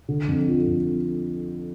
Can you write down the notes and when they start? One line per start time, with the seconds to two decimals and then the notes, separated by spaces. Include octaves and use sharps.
0.08 D3
0.28 F2
0.48 F3
0.68 F2